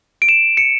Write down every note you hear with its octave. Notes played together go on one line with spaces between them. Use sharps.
D7
E7
C#7